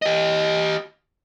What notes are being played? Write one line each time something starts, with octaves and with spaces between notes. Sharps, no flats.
G4 D#5